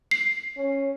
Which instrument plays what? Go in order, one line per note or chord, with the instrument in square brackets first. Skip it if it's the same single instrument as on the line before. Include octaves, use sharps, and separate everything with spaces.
[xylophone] C7
[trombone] C#4